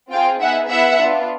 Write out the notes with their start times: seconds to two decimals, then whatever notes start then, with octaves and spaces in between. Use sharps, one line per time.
0.11 C4 F4 G#4 F5 G5
0.42 B3 D#4 G#4 E5 F#5
0.70 B3 E4 G#4 E5 F#5
1.00 B3 D4 F4